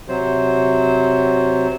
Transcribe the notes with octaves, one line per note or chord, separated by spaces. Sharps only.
C3 F#3 C5